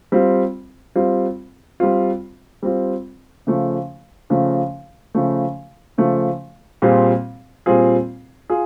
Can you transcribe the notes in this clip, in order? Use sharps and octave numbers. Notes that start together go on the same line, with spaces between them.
G3 C4 F4
G3 C4 F4
G3 C4 F4
G3 C4 F4
C#3 F3 A3
C#3 F3 A3
C#3 F3 A3
C#3 F3 A3
A#2 G3 C4 F4 G#4
A#2 G3 C4 F4 G#4
F4 G#4